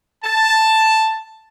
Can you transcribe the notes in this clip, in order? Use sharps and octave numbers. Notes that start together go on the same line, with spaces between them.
A5